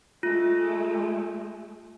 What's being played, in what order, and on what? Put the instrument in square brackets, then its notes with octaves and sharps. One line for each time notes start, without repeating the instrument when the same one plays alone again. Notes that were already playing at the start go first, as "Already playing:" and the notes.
[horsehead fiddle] G#3 A3 [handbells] F4